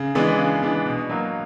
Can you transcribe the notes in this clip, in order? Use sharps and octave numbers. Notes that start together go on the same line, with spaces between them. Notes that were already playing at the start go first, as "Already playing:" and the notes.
Already playing: C#3
E3 G#3 B3 D4
C#3
E3 G#3 B3 D4
B2
F#3 A#3